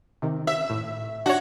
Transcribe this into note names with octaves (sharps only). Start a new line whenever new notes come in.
C3 D#3
E5
A2
D4 F#4 C#5